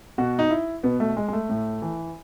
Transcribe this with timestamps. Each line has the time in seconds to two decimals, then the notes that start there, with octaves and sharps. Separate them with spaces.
0.18 B2 F#4
0.39 D#4
0.51 E4
0.83 B2 B3
1.00 A3
1.17 G#3
1.28 G#3
1.33 A3
1.49 A2
1.82 E3